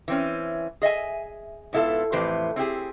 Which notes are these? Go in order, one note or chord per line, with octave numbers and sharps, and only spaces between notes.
E3 C4 C#4
G#4 D#5 E5 G#5
G#2 B3 E4 F4 A4 E5
F2 A2 E3 G4 B4 C5
C4 E4 G4 G#4